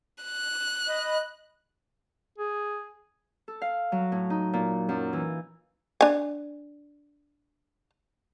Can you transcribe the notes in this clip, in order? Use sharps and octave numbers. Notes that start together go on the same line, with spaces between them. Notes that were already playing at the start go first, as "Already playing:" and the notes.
F#6
D#5 B5
G#4
A4
F5
F#3
A2
D#4
A#2
F#2
E3
D4 G#5